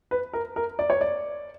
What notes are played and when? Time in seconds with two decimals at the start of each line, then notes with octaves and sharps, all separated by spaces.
0.11 B4
0.33 A#4
0.56 A#4
0.79 D5
0.90 C#5
1.01 D5